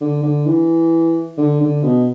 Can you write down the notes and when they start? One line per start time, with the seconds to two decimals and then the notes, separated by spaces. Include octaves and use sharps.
0.01 D3
0.23 D3
0.46 E3
1.38 D3
1.60 D3
1.83 B2